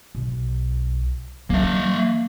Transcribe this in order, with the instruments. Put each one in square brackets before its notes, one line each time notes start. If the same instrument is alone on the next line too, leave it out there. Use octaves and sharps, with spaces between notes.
[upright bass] B1
[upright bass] E3 F#3 [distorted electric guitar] A#3 E5